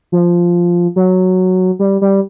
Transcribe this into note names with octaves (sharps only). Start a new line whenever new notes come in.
F3
F#3
G3
G3